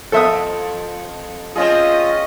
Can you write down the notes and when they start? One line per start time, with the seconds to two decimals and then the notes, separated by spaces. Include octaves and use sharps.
0.12 F2 A4 C5 E5 D#6
1.56 C4 C#4 F4 G#4 D#5